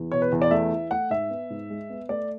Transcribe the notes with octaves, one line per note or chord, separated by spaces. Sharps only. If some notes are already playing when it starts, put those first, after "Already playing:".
Already playing: E2
B2 C#5
B4
E2
D5
A3 E5
E3
A3 F#5
G#2 E5
B3
G#2
G#3
B3
A3 D5